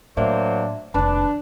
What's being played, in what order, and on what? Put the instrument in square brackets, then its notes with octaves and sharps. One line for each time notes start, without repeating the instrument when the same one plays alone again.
[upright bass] A2 [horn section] F#3 A#3 C5 [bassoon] D4 [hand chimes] E5
[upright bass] F1 D#2 [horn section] D4 [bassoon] B4 [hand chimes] A5